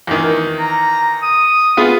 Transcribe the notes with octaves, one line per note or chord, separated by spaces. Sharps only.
E2 D#3
A#5
D#6
B3 F4 G#4